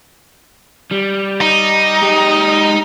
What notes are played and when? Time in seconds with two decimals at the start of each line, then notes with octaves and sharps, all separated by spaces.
0.91 G3
1.41 D#4
2.03 G#3 G4